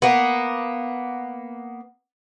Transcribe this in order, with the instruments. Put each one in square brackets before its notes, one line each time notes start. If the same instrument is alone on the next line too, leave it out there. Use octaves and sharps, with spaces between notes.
[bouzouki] A#3 B3